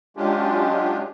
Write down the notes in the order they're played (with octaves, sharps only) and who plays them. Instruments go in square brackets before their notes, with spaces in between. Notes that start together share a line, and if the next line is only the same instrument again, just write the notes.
[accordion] F#3 G#3 C#4 D4 F4 G4